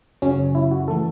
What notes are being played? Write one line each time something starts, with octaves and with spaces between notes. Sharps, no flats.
F#2 C#3 F#3 C#4
E4
F#4
E3 A3 A4